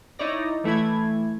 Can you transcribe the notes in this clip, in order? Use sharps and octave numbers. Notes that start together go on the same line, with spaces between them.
D#4 E4 C#5 D5 A#6
E3 A3 E4 G#6